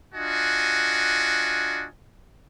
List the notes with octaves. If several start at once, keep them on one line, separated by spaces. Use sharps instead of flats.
D4 F4 F#4 D#5 G#5